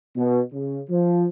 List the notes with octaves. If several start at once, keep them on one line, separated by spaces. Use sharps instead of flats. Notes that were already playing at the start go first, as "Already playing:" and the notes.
B2
C#3
F3